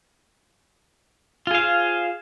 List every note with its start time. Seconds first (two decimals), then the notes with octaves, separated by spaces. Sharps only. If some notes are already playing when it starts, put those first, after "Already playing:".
1.47 F4
1.51 G#4
1.55 F5
1.58 C5